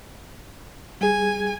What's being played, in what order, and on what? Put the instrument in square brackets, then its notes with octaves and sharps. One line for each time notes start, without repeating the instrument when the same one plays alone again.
[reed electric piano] G3 G#4 [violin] G#5